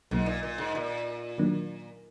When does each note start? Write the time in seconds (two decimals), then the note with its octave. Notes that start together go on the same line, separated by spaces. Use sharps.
0.11 B1 G#2 B2 F#3 A#3
0.26 A#2
0.43 A#2
0.58 G#2
0.75 A#2
1.38 D#3 F#3 A#3 D4